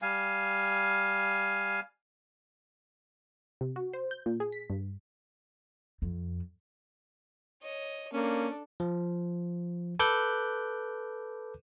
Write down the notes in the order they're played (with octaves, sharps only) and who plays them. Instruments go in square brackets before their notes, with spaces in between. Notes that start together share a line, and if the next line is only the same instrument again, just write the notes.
[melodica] G3 F5 G#5
[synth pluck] C3
F#4
C5
G6
A#2
G#4
B6
G2
[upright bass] F2
[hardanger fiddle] C#5 D#5
[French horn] A#3 [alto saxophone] C#4 [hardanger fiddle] D4 A4
[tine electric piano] F3
A4 B4 D6 F#6 G6